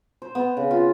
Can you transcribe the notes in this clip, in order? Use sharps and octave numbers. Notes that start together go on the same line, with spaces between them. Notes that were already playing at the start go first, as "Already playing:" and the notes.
C5
B3
C#3
F4